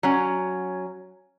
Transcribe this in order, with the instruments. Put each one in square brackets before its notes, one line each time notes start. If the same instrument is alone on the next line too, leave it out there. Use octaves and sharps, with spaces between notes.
[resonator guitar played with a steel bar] F#3 C#4